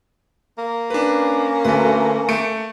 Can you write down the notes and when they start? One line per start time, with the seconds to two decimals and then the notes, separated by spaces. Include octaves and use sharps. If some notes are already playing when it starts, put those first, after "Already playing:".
0.58 A#3
0.90 C#4 D4 B4
1.64 D2 A4 B4
2.29 A3 C#7 D7